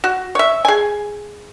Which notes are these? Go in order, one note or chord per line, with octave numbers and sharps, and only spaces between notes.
F#4
C#5 E5
G#4 G#5